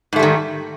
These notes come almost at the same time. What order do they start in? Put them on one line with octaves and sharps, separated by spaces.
G#2 A3 G3 D#3